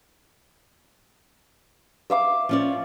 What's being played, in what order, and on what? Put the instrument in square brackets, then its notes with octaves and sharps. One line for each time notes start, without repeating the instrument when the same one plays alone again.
[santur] E5 F5 D6
[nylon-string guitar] F3 C#4 D5